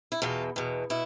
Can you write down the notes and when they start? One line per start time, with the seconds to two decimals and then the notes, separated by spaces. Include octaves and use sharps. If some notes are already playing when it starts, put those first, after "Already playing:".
0.12 E4
0.22 E2 B2 F4
0.56 E2 B2
0.90 B2 E4